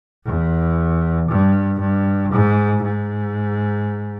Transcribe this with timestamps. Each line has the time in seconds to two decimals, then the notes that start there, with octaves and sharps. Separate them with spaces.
0.25 E2
1.28 G2
1.79 G2
2.31 G#2
2.83 G#2